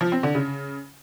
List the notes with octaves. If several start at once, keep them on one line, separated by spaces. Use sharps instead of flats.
F3
C4
D3
C#3